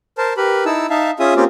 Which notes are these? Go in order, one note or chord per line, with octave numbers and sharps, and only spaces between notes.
A#4 C5 A5
G4 A#4 B4 B5
D#4 E4 A5 E6
D#4 E5 F5 A5
C#4 F4 G#4 E5 D#6
A#3 C4 C#4 F4 G4